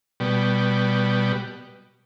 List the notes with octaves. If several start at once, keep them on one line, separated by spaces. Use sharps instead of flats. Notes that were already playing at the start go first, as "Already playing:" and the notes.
B2 G3